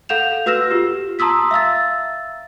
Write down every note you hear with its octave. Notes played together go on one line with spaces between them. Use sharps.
A4 F5 F#5 G6 E7 F7
F#4 B4 E6 F6 A#6 E7
F4 G4
A5 A#5 C6 D#6 E6 B6
E5 F5 E6 A6